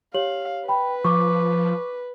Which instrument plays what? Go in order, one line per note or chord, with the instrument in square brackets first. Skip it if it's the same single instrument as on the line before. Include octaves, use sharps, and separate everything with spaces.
[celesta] G4 C#5 F#7 [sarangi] F5
[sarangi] B4 [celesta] G5 B5
[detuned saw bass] F3 [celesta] C#6 D6